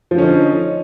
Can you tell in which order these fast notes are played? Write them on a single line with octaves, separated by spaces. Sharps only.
F3 D3 C#4 D#4